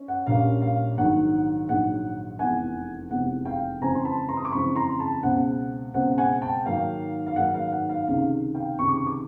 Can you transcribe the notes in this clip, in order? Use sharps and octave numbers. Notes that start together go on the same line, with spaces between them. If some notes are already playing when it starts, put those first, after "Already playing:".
Already playing: C#4
F#5
A#1 A#2 G3 A#3 C#4 F5
F5
A#1 G#2 D#3 F#3 F#5
A#1 G#2 D#3 F#3 F#5
F1 E2 C3 E3 G#3 F#5 G#5
F1 E2 C3 E3 G#3 F#5
F5 G5
F2 C#3 E3 G#3 C4 G#5 A#5
C6
A5 B5
A#5 C6
D#6
D6
F2 C#3 E3 G#3 C4 B5 C#6
A#5 C6
A5 B5
C#2 B2 G#3 C4 F#5
C#2 B2 G#3 C4 F#5
F#5 G#5
G5 A5
G#2 D#3 F#3 A#3 F5 G5
F5
G#2 D#3 F#3 A#3 F#5
F5
F#5
F5
C#2 C3 D#3 F5
F5 G5
C#2 C3 D#3 C#6
D6
C#6
D6